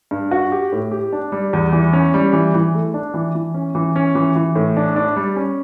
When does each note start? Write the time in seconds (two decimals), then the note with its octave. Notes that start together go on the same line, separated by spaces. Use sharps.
0.11 G2
0.31 F#4
0.52 G4
0.72 A2
0.91 G4
1.13 D4
1.32 G3
1.53 E2
1.73 E3
1.93 C#4
2.14 G3
2.33 E3
2.54 E3
2.74 A3
2.94 D4
3.14 E3
3.35 E3
3.54 C#4
3.75 E3
3.96 C#4
4.15 E3
4.35 E3
4.56 A2
4.77 D4
4.96 D4
5.16 G3
5.36 C#4